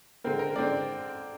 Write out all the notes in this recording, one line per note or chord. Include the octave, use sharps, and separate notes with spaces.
D3 G#3 C4 A#4
A#4
D3 G#3 C4 D5